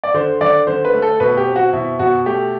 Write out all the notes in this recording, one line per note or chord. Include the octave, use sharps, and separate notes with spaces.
D5
D3 C5
D3 D5
D3 C5
B4
A3
A4
B2 B4
G4
C4
F#4
B2 E4
B2 F#4
A3 G4